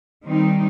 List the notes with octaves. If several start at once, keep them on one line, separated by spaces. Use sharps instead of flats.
D#3 G3 C4 D#4